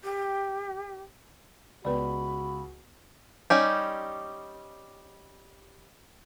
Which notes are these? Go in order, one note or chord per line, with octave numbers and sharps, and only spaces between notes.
G4
C#2 B3 F#4 B4 D5 B5
G3 C#4 D#4 G4